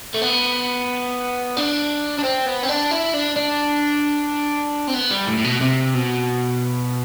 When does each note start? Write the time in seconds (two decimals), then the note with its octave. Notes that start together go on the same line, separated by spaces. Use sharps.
0.15 A3
0.22 B3
1.57 D4
2.19 D4
2.24 C4
2.46 B3
2.63 C4
2.69 D4
2.91 E4
3.14 D4
3.36 D4
4.88 C4
4.94 B3
5.11 G3
5.27 A2
5.38 A2
5.44 B2
5.61 C3
5.95 B2